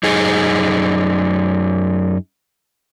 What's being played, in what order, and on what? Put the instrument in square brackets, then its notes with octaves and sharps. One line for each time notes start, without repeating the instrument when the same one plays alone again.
[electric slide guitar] F#2 D#4 G#4